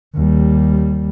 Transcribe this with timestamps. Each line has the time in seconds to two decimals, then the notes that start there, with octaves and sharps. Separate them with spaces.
0.15 D#2 G3